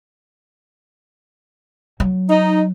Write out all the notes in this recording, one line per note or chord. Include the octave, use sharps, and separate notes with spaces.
F#3
D#4